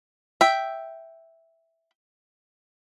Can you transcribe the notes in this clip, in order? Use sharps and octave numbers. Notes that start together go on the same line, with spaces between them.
E5 G5